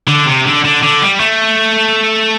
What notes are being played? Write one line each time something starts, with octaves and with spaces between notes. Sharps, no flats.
D3
C3
D3
D3
D3
G3
A3